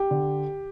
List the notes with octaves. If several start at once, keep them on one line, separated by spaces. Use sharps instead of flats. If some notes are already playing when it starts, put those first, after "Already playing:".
Already playing: G4
D3